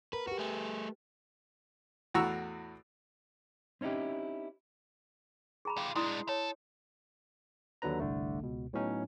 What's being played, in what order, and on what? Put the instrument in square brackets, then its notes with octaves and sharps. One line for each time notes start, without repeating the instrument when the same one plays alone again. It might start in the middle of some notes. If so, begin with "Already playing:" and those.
[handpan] A#4 [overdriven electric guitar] B4
[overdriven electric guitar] F#4 [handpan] G4 B4
[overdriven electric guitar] A3 G#4
[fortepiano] E2 A2 F#4 A#5 C#6 E6
[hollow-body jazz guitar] C4 C#4 D#4 E4 G4
[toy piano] G#4 A#5 B5
[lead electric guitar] F4 G4
[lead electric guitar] G#3 D4 [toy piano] E4 C6 D#6
[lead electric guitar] A4 [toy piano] C#5
[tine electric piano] D#2 D3 F#3 D4 B4 A#5
G1 C2 D3 A3
C#2 B2
A2 F#3 B3 C#4 D#4